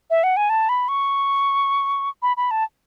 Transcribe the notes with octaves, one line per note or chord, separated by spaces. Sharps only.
E5
F#5
G#5
A5
B5
C#6
B5
B5
A5